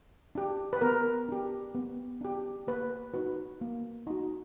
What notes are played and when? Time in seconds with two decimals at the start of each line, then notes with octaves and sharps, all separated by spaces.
0.35 D4 G4
0.73 B4
0.81 B3 A#4
1.29 D4 G4
1.75 B3
2.21 D4 G4
2.67 A#3 B4
3.14 D#4 F#4 B4
3.61 A#3
4.07 D#4 F#4